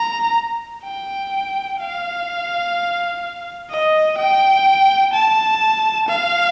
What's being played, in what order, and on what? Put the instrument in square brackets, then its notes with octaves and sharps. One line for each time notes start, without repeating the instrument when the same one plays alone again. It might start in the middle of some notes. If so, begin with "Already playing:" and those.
Already playing: [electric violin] A#5
G5
F5
D#5
G5
A5
F5